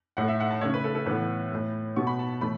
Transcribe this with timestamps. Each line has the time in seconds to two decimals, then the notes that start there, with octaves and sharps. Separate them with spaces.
0.17 A2 A3 F#5
0.28 E5
0.40 F#5
0.51 A5
0.61 C#3 A3 C#5
0.74 B4
0.84 A4
0.95 A4
1.06 A2 E3 B3 B4
1.52 A2 A3
1.96 B2 B3 C#6
2.07 B5
2.19 A5
2.41 A2 E3 A3 B5